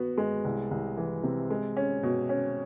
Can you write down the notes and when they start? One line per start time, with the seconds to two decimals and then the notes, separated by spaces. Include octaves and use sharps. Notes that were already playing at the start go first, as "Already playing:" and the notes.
Already playing: B3 F#4
0.18 G#3
0.44 C2
0.71 C2
0.97 E3
1.23 C3
1.50 G#3
1.76 C#4
2.03 B2
2.29 C#4